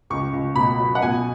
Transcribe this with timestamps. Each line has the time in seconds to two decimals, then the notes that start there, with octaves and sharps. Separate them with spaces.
0.10 C#2 C#6
0.33 C#2
0.56 B2 B5
0.79 F#3
0.95 F#5
1.02 B2 G#5